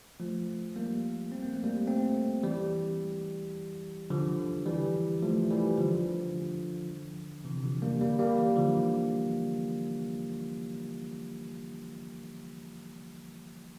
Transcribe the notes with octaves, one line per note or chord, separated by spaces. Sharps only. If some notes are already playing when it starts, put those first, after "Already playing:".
F3 A3
G3 A#3
C4
A#3
A3
G3 A#3
A3 C4
E3 G3
D3 F3
E3 G3
F3 A3
E3 G3
D3 F3
D3
C3 E3
D3 F3
G3 A#3
G3 A#3
G3 A#3
E3 G3
D3 F3